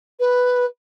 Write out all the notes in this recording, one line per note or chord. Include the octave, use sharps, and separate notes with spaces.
B4